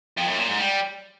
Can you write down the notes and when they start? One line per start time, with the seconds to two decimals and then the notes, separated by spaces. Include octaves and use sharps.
0.18 F2
0.28 F#2
0.38 A#2
0.48 G#2
0.59 G3